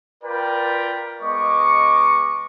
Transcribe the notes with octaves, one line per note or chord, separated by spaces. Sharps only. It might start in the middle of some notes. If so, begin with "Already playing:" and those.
F4 A#4 B4 D5 G5 B5
G#3 B3 D#5 C#6 D6